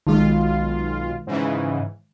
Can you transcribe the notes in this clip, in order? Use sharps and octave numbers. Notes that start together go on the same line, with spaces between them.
B1 D#3 G#3 F4
G#2 C#3 E3